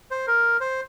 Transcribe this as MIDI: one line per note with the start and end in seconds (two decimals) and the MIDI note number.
0.11 0.26 72
0.27 0.57 70
0.60 0.81 72